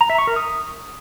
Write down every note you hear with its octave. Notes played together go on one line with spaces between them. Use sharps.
A#5
E5
C#6
A#4
D#6